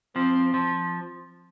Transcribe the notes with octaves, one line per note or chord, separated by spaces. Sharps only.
F3 C4
F3